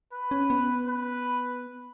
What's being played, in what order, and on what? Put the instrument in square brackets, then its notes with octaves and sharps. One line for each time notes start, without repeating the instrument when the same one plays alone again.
[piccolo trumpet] B4
[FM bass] C#4
B3
[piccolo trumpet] B4